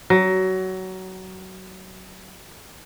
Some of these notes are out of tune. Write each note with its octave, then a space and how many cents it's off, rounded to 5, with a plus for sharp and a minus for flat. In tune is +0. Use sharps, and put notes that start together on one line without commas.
F#3 +20